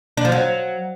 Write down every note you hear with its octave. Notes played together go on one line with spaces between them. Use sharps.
D4
F3
F#3